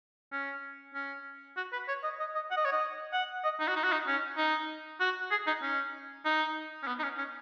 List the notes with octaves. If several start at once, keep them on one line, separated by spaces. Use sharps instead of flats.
C#4
C#4
F#4
B4
C#5
D#5
D#5
D#5
F#5
D#5
C#5
D#5
F#5
D#5
D#4
F#4
D#4
F#4
D#4
C#4
D#4
F#4
G#4
D#4
C#4
D#4
C#4
B3
D#4
C#4
C#4